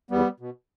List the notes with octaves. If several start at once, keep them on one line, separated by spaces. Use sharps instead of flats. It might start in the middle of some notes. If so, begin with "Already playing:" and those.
E2 G3 B3
B2